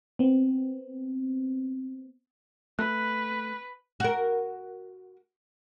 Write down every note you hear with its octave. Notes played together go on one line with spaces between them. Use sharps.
B3 C4
A3 B4 F#6
F#4 A#4